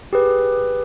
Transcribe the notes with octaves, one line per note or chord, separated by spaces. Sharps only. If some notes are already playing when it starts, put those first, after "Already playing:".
G4 G#4 B4